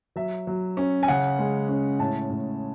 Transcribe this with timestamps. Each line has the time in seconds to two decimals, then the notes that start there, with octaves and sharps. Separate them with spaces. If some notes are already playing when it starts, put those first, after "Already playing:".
0.16 F#3 E5
0.47 F#3
0.77 C#4
1.03 G#5
1.08 C#3 F#5
1.39 G#3
1.69 C#4
1.99 A2 A5
2.30 A2